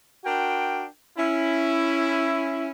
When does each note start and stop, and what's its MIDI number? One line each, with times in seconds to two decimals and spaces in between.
0.25 0.85 62
0.25 0.85 66
0.25 0.85 70
0.25 0.85 79
1.18 2.71 61
1.18 2.71 64